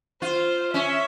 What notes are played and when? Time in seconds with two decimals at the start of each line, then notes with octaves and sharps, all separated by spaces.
0.22 F4 C5
0.73 C#4 E5